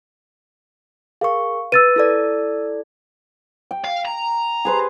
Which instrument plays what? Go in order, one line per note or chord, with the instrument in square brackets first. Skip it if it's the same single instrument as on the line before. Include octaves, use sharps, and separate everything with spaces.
[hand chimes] G#4 A#4 C#6 [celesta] F5
[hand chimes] B4 [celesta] E6 A6 D#7
[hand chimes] E4 A4 D5
[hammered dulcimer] G5
[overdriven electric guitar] F5
A#5
[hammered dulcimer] G#4 B4 C5